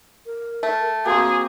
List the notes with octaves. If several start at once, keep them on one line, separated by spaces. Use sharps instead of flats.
A#4
A3
A#3 C4 F#4 G#4